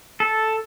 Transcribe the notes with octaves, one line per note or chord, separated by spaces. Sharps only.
A4